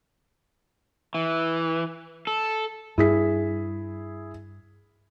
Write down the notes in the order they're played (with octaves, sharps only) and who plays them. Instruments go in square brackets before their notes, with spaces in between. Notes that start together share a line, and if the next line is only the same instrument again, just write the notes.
[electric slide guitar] E3
A4
[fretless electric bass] G2 [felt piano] E4 G#4 B6